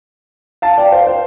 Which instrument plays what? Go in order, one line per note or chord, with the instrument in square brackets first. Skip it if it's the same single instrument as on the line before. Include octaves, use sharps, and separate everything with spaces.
[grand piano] F5 A5
D5 G5
C5 F5
C5